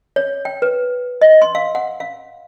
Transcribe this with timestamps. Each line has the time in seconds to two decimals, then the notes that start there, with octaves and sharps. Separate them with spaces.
0.16 C#5
0.45 G5
0.62 B4
1.22 D#5
1.42 C6
1.55 F5
1.75 F#5
2.00 F5